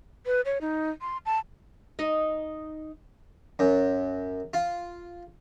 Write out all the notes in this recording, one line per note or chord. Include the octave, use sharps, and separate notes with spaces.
B4
C#5
D#4
C6
A5
D#4 D#5
F#2
F4